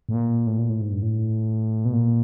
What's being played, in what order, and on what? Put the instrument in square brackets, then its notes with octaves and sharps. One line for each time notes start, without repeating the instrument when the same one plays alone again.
[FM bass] A2
A#2
A2
A#2
A2
G#2
G2
A2
B2
A#2